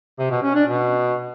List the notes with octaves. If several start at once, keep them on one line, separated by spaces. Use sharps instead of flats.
C3
B2
C#4
D4
B2